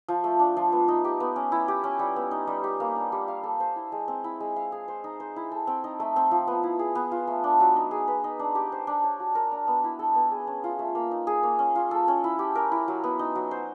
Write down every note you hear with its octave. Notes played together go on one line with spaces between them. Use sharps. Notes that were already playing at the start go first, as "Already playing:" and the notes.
F3
A3
D4
F3
B3
D#4
G4
B3
C#4
E4
G4
C#4
G3
B3
D#4
G3
G4
A#3
D4
G3
F5
A4
C5
E4
G#3
C4
E4
G#3
F5
G#4
C5
D#4
C5
E4
A4
C4
D#4
A3
C4
F3
B3
E4
G#4
B3
F4
A3
D4
F#3
D#4
G#4
B4
D#4
D4
G4
C5
D4
C#5
F#4
A#4
D4
B3
E4
A4
B3
G#4
C#4
F4
A3
A#3
D#4
G#4
A#3
C#4
F4
A4
C#4
E4
G4
A#4
E4
F#3
B3
D#4
F#3
C5